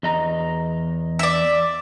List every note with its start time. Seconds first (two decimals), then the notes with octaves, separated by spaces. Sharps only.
0.03 E2 D#5 A#5
1.19 D5 E5